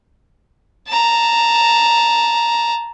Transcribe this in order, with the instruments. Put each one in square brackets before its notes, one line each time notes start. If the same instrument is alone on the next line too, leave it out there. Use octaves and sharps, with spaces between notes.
[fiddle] A5 A#5